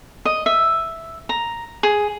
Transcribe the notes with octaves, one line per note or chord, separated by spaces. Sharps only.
D#5
E5
A#5
G#4